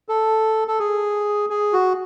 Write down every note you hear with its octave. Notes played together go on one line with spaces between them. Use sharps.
A4
A4
G#4
G#4
F#4